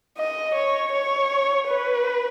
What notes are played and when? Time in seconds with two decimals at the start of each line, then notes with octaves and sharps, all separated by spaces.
0.18 D#5
0.55 C#5
0.92 C#5
1.67 B4